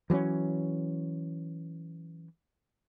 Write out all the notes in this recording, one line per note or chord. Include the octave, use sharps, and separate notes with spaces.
E3 F#3 A#3 C#4